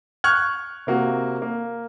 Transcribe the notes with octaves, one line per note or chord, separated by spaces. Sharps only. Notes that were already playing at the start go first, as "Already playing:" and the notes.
C#6 F6 F#6 G#6
C3 A#3 F#4
A#3